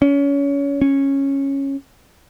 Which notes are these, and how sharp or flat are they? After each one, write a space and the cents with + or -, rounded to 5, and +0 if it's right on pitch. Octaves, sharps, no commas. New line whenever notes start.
C#4 +25
C#4 -10